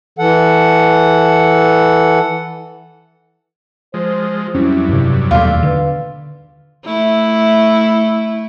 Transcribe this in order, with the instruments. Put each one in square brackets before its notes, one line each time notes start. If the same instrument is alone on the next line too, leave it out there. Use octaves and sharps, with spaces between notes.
[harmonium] E3 A4 F#5
[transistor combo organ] F3 G#3 [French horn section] C5
[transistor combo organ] F2 F#3 G3 [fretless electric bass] C#4 [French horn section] E4
[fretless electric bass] G2 C3
[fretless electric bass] D#2 B2 [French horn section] G#3 A3 [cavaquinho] F4 D5 E5
[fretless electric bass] D3 [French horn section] B4
[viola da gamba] A3 E4